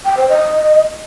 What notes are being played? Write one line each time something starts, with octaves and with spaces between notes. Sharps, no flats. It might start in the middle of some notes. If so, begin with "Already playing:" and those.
G5
C5
D#5